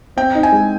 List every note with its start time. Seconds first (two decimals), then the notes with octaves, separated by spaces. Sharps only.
0.17 C4 G5
0.35 D#4
0.43 G#5
0.52 G#3